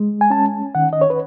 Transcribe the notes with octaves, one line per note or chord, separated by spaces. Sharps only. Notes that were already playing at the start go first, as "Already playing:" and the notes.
Already playing: G#3
G#5
C#4 A5
D#3 F#5
D#5
C#5
B4